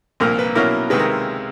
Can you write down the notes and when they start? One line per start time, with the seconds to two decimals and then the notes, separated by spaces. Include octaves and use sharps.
0.20 C2 A#2 F3 A#3 A#4
0.39 B4
0.55 B2 F#3 A#3 C#4 E4 A#4
0.90 C#2 C3 D#3 G#3 B4
0.99 A#4